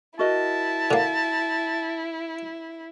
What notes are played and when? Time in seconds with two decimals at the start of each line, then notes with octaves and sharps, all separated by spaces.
0.19 E4 F#4 A#4 D#5 A5
0.91 D3 A#3